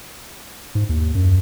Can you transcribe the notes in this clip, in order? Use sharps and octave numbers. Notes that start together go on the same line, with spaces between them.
G#2
D#2
F#2